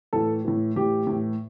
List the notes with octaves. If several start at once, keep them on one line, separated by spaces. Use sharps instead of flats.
A2 E3 A4
A2 E3
A2 E3 G4
A2 E3